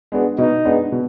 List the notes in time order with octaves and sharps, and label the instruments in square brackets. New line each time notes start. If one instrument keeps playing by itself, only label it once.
[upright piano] G#3 B3 D4 F#4
[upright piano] B2 [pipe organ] D#4
[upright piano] G#3 B3 D4 F#4
B2